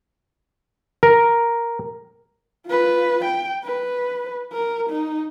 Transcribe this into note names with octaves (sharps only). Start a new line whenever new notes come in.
A#4
F4 B4
G5
B4
A#4
D#4